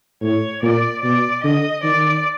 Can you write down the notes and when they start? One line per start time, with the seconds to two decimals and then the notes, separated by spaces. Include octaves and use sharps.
0.22 A2 C#5
0.62 A#2 D5
1.03 B2 D5
1.43 D3 D#5
1.84 D#3 D5